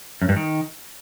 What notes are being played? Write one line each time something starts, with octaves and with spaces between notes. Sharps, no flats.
F#2
G2
D#3